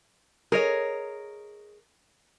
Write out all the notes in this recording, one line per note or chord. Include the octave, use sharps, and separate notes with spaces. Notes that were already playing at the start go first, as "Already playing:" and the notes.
G#4 A#4 C#5 D#5